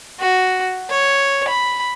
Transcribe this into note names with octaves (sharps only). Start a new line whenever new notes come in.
F#4
C#5
B5